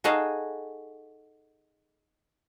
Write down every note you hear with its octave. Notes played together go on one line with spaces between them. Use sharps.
D#4 F#4 G#4 A4 D#5 F5